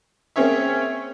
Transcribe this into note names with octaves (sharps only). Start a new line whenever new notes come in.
A#3 C4 C#4 G#4 C#5 E5